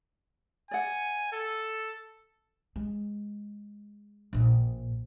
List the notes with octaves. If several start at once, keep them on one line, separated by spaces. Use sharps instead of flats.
D5 F#5 G#5
A4
G#3
A#1 A#2